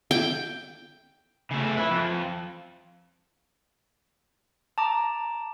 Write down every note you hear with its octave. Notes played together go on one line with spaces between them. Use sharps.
G5
C#3 A3
E4 B4
F2
A5 A#5 D6